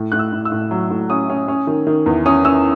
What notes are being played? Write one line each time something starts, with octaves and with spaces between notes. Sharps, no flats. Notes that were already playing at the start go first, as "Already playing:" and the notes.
Already playing: A2
A2 F#6
E6
A2
E6
A2
F#3
A2
C#4 D#6
C#4
C#4
D#3
D#3
E2
C#4 D#6
C#4 E6